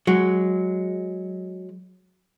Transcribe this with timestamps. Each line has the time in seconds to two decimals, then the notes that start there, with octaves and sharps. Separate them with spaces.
0.07 F#3 G#3